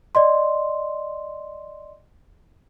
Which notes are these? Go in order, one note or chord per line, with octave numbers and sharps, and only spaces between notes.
D5 D#5 C6